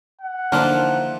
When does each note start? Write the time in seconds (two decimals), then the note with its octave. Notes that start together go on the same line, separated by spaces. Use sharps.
0.21 F#5
0.52 D3 E3 F3 A#3 D4 D#4 A#4 C5